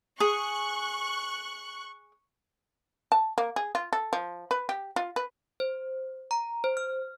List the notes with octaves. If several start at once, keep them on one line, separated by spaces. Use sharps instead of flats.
G#4 C#6 F#6
A5
A#3
G#4
F4
A4
F3
B4
G4
F4
B4
C5
A#5
C5
F6